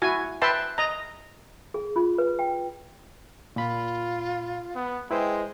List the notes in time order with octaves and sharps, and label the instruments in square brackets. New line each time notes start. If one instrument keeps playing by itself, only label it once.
[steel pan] E4 F#4 G#5
B4 E5 G5 A5 C6
D#5 A#5
[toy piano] G#4
F4
B4
G5
[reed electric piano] A#2 B5 [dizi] F4
[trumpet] B3
[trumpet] G#3 [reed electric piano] E4 B4 C5 [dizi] G5